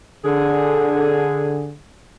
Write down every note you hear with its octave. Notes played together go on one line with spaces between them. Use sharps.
D3 G#4